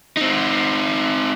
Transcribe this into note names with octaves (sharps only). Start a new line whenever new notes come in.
C4 D#4